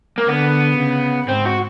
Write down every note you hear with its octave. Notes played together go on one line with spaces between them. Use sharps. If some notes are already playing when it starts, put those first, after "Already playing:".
A#3
D3 B3
C#3
G#2 C4
F#4